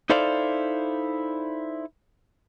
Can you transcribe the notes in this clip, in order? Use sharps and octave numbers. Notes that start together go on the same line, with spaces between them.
D#4 E4 A4 C5 D5 F5